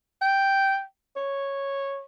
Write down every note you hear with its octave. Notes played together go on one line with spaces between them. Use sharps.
G5
C#5